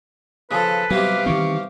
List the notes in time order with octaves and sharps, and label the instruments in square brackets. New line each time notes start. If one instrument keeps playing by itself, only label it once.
[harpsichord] C#3 F3 [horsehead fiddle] A4 [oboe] B4
[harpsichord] C3 G3 B3 [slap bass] F#3 [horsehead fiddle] G4 F5
[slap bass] D#3 E3 C4 [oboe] C#6